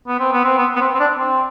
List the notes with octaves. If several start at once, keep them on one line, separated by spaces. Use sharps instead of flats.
B3
C4
B3
C4
B3
B3
C4
C4
D4
C4